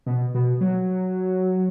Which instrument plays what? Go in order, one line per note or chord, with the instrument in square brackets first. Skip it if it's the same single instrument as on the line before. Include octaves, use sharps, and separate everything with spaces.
[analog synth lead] B2
B2
F#3